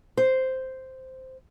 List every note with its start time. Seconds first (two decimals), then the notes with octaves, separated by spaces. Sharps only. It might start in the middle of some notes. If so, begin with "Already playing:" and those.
0.17 C5